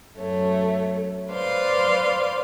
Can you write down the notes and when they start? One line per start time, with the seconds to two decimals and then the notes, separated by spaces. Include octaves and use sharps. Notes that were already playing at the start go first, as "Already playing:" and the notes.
0.17 F#2 A3 C#5
1.31 B4 C5 D5 F5 C6